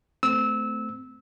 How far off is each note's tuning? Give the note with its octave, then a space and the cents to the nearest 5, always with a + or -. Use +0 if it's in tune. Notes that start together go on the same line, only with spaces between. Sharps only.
A3 +0 C4 -25 E6 -20